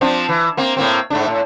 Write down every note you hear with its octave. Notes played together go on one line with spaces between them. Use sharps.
F3 C4 D4
E3
A#3 C4
A2 A#3 C4
G#2 A3 D4
A2